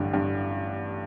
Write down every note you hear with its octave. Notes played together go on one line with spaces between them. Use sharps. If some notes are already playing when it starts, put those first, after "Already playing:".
Already playing: A1 G2 D3
G2